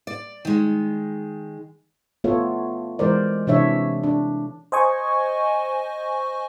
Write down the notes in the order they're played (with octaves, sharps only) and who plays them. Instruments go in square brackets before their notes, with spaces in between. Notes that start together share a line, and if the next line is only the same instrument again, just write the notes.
[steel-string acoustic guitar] D5
D#3 G#3
[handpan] A3 B3 F4 A4 C#5
E3 G#3 A#4 C5 D5
C3 E3 D4 C#5 E5
D4
[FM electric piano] C5 D#5 G#5 C#6